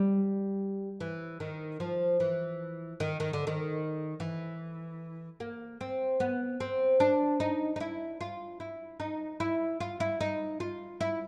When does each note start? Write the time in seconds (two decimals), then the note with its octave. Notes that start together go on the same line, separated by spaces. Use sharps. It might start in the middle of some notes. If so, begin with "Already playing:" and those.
Already playing: G3
1.00 E3
1.40 D#3
1.80 F3
2.20 E3
3.00 D#3
3.20 D#3
3.33 D3
3.47 D#3
4.20 E3
5.40 A#3
5.81 C4
6.20 B3
6.60 C4
7.00 D4
7.40 D#4
7.76 D#4
7.80 E4
8.21 F4
8.60 E4
9.00 D#4
9.40 E4
9.80 F4
10.00 E4
10.21 D#4
10.60 F4
11.01 E4